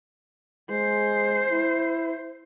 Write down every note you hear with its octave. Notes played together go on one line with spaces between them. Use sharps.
G#3 C5
E4